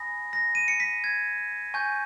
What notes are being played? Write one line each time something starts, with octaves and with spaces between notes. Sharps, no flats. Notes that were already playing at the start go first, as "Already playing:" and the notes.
Already playing: G#5 B5 D#6 A#6
A#6
D#7
C#7
B6
G#6
G#5 C#6 G6